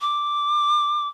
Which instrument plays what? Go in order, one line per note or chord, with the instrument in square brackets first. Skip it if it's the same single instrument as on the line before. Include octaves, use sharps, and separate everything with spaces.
[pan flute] D6